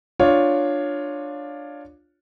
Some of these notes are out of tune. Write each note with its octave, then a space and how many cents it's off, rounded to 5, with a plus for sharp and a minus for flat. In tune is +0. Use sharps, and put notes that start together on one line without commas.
D4 +10 F4 +10 C#5 +5